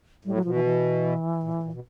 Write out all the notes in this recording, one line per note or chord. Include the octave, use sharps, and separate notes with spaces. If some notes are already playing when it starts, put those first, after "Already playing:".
A2 G3
F#3
B2 F3
E3
E3
A#2
A2
A#2
B2